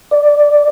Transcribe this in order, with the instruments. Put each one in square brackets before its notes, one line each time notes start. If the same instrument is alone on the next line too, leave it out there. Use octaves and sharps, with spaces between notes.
[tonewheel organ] D5